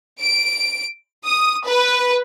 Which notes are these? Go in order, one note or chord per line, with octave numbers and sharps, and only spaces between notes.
D7
D#6
B4